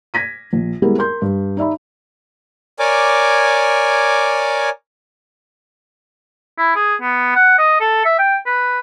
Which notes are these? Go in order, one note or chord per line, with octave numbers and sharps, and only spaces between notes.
G#6 A#6 B6 D#7
A#1
G3 G#3 B3 E4 G#4 A#4
A#4 C6 G6
G2
D#4 D5 E5 B5
A#4 C#5 D5 G#5 D6
E4
G#4
B3
F#5
D#5
A4
E5
G5
B4